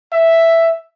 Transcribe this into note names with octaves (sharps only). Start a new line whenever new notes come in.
E5